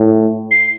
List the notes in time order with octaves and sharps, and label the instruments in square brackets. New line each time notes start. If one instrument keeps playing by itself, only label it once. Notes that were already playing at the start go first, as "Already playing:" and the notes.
Already playing: [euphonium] A2
[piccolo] C7